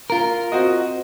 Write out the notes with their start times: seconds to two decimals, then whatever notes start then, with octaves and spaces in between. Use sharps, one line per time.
0.10 F4 A#4
0.52 C4 F#4 D#5